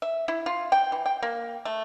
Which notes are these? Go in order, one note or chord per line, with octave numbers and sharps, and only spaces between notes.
E5
E4
F4
G5
E3
G5
A#3
A3